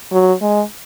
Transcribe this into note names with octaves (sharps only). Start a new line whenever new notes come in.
F#3
G#3